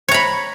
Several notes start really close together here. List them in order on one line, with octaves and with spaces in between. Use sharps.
C#5 A#5 B5